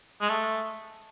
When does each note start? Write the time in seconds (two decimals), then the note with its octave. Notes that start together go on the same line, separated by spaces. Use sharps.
0.21 G#3
0.29 A3